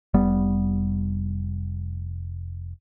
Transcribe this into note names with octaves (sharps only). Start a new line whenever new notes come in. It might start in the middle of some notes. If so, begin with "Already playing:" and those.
F1 G3 B3